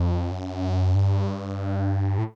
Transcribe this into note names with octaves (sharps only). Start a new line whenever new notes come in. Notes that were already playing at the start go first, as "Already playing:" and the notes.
Already playing: F2
F#2
G2
A2